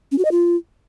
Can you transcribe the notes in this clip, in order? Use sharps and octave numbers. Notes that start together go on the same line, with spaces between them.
C#4
F#4
D#5
F4